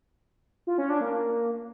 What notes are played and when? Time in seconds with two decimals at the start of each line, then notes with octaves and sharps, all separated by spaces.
0.67 F4
0.78 C#4
0.89 D4
1.01 A#3